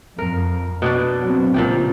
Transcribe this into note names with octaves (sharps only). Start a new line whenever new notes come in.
F2 A#4
B2 B3 D4 D5
F#3 B3 C4
C#2 A#2 F3 G4